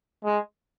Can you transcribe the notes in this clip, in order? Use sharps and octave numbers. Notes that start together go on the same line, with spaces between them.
G#3